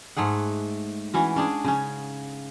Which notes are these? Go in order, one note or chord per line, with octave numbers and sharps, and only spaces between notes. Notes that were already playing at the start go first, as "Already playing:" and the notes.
G#2 A3 G#4 F#5
E3 C#4 F#4
C#4 D4 G#4
C#3 C#4